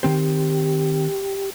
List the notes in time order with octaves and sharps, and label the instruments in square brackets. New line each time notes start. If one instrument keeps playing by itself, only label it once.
[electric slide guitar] D#3 C4 C5 [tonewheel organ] G4